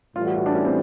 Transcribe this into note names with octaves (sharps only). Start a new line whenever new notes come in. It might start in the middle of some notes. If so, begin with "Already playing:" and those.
A2 E3 G3 F4
F#4
F#4
D4
C#4
C4